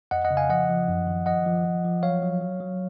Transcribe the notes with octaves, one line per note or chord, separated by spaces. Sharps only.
F2 D#5 F#5
D#5 F#5
C#3
F5 G#5
F3 D#5 F#5
F3
F#2
D#3
F3 D#5 F#5
F3
F3
F3
F#3 C#5 F5
F#3
F#3
F#3